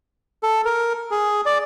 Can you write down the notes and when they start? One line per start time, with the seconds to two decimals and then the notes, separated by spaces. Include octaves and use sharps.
0.43 A4
0.65 A#4
1.11 G#4
1.46 D5